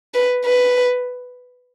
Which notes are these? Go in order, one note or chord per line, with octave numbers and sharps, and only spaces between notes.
B4
B4